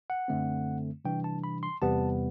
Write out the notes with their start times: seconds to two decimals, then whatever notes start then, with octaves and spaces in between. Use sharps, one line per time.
0.10 F#5
0.28 F#2 D3 A3 C4
1.05 C3 E3 G3 D4 G5
1.24 A5
1.44 B5
1.63 C6
1.82 E2 C3 G3 B3 A5